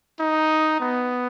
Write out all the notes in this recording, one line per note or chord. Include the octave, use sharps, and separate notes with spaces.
D#4
B3